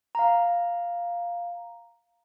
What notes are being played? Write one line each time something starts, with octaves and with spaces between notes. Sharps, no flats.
F5 A#5